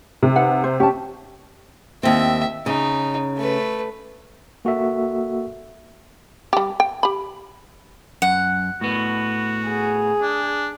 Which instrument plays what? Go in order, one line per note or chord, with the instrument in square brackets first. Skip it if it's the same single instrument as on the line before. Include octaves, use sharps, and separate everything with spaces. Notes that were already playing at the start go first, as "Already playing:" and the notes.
[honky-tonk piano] C3
[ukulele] D#4 B4 F#5
C5
[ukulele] C#4 A5 [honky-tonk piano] G4
[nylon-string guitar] D#2 C4 [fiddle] E5
[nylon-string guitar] C#3 [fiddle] D#4
[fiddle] A3 B4
[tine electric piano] A#3 F#4 A4 E5
[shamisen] G3 G4
G5
G4 B5
[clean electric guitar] F#2 [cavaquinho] F#5
[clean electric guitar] A2 B3 [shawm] F#4
[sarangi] G#4
[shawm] D4